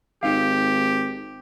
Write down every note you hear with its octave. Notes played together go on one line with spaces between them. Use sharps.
G#1 D#4 G4 F5